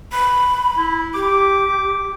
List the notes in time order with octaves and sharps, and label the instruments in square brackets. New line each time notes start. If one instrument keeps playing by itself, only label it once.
[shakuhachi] B5
[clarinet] E4
[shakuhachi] G4 [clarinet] D6